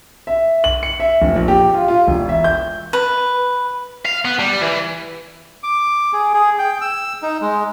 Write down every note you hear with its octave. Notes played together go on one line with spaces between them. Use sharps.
E5
F#7
C#7
E5
F1
A#1
G4
F4
F4
E1
E5
G6
B4
F5
B3
G3
E3
D6
G#4
G#4
G5
E6
D#4
G#3